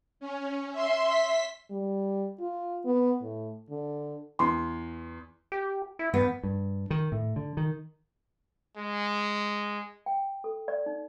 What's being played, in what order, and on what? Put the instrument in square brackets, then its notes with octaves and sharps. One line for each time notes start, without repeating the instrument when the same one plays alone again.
[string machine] C#4
E5 C6
B6
[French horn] G3
F4
B3
A2
D3
[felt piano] E2 C6
[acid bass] G4
E4
[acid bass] G2 [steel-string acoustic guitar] B3
[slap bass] G2
D#3
A2
D3
D#3
[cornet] G#3
[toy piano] G5
A4
D5
D#4